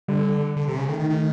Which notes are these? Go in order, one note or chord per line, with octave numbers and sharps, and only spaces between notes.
D3 G3
D3
C3
C#3
D#3 A3
D#3
D#3